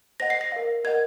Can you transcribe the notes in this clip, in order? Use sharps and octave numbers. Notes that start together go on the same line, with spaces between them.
C5 D#5 F#5 A#6
C7
A#6
A#4 F5
A#4 D#5 F#5 G#6